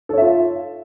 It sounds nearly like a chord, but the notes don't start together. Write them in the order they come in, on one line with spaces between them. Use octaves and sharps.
A4 C#5 E5 F4